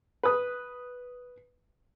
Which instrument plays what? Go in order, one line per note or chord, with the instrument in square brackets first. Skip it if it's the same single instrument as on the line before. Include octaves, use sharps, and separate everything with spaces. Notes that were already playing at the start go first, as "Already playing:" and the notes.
[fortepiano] B4 D#6